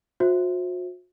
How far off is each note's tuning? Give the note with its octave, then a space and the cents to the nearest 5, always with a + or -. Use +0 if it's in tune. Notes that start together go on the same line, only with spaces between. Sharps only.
F#4 -40 C5 +15 E5 +0